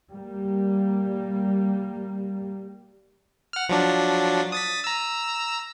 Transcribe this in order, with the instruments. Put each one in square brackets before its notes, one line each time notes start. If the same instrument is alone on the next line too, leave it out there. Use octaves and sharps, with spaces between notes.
[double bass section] G3 A#3
[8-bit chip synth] F#5 F6
F3 F#3 D4
D#6 A6 B6
A#5 E6